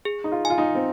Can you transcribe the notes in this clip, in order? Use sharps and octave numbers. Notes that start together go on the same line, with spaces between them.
G#4
D#4
F4
G#5
F4
D#4
C4